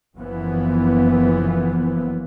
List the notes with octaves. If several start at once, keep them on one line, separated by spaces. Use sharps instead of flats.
F#1 F#2 E3 F3 B3